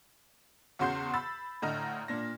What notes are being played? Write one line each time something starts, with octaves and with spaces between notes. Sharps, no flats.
E2 C#3 F#4 C6 G6 C7
B5 E6 A6
A2 D3 D#5 A#5 F6
A#2 D4 A#6